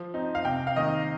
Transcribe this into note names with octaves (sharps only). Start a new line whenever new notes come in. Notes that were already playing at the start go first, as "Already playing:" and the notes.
Already playing: F3
C4 D#4
F5
C3 G5
F5
D#3 A#3 D#4 D#5